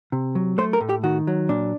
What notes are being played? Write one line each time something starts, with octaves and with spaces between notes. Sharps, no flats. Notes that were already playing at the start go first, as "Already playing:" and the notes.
C3
F#3
A3 C5
A#4
A2
G4
D#3 F#4
F#3
A#2 D4